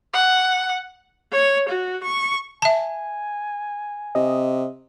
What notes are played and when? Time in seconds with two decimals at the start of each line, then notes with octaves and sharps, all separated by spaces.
0.13 F#5
1.33 C#5
1.69 F#4
2.04 C#6
2.62 E5 G#5 A5
4.15 C3 D#5